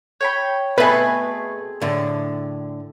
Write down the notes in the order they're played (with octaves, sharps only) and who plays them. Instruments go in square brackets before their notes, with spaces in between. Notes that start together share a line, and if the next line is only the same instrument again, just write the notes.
[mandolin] C#5 G5 B5
[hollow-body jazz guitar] B2 A3 [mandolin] C4 E4 G#4 [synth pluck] B4
[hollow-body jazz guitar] A2 D3